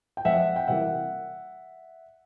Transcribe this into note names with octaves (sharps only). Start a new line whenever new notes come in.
G5
F2 E5 F#5
G5
C3 E3 G3 A#3 E5 F#5